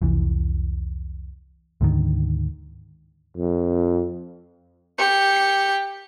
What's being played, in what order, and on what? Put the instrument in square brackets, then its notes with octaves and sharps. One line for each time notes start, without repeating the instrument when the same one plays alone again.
[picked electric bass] F1 C2 E3
D2 G#2 D3 D#3
[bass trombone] F2
[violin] G4 C#7